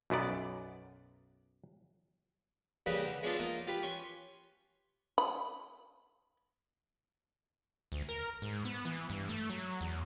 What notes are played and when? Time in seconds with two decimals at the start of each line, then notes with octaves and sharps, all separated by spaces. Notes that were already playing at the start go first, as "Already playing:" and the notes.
0.10 B1 F#2 B3 D5
2.86 C#3 G3 A#3 D#4 G4 B4
3.05 D3
3.23 G#3 B3 C#4 D4 F4 A4
3.39 A#3 D#4 F4
3.67 F4 G4 B4
3.83 C#4 C6 C#6
5.18 B5
7.92 D2
8.09 A#4
8.42 G#2
8.65 B3
8.85 E3
9.10 G2
9.29 A3
9.50 F#3
9.81 E2